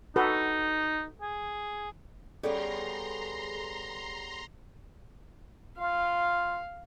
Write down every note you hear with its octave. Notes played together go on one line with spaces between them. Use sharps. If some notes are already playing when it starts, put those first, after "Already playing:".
D#4 F#4 A4 B4
G#4
G3 B3 C#4 G#4 A4 A#5 C6
F4 F5